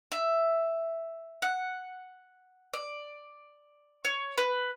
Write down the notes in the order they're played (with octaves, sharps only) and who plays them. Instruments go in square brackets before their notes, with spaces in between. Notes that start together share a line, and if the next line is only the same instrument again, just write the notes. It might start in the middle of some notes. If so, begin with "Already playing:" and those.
[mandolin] E5
F#5
D5
C#5
B4